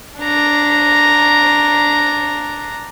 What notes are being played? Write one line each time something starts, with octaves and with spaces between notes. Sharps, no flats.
D4 A#5